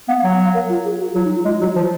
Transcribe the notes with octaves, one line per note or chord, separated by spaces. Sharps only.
B3 F5
F#3 F#5
F5
A#4
F4
G#4
F#4
F#3 F4
D#4
F4
G#3 F4
F#3 F#4
F3 F4